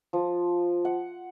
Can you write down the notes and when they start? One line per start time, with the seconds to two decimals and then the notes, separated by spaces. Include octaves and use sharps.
0.13 F3
0.85 F#5